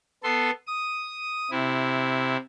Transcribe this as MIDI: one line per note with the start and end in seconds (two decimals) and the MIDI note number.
0.23 0.51 59
0.23 0.51 69
0.23 0.51 84
0.67 1.50 87
1.51 2.37 48
1.51 2.37 64